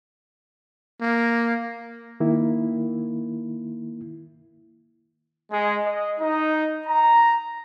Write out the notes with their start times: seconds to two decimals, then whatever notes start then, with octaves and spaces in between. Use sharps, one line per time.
1.01 A#3
2.20 D#3 A#3 E4
5.52 G#3
5.86 D#5
6.20 D#4
6.86 A#5